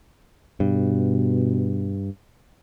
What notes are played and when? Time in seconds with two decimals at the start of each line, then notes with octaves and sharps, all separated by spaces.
0.60 G2 B2